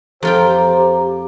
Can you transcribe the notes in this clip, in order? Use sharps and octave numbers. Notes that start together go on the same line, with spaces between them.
F2 F4 G4 C5 G5 A#5